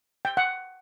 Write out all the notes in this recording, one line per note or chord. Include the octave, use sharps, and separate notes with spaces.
G5
F#5